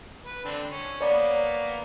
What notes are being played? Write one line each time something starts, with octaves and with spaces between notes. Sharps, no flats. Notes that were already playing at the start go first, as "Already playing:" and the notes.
B4
D3 C4 D4
C#4
A#3 B3 C#5 D5